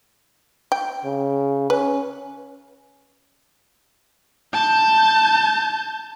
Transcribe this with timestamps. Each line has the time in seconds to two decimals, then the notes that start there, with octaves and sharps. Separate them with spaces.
0.72 G5
1.05 C#3
1.70 C#4 B4
4.53 A5 G6